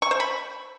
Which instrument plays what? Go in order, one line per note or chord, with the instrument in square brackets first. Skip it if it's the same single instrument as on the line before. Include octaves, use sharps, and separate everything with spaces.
[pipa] C#6
C5
B5